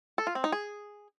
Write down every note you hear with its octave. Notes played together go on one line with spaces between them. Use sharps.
A4
F4
C4
D#4
G#4